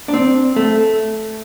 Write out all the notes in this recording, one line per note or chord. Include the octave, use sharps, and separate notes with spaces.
D4
C4
A3